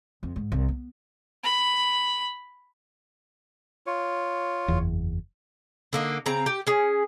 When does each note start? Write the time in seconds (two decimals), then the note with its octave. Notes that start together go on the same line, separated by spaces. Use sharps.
0.23 F2
0.36 G#2
0.52 C2
0.69 B3
1.43 B5
3.86 F4 C#5
4.68 F#1 E2
5.93 D3 A#3 D#4
6.26 C#3 C4 A#5
6.46 G4
6.67 C#4 G#4